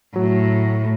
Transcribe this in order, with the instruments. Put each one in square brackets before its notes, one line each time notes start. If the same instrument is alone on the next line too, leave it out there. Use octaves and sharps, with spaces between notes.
[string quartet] A2 [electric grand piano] F#3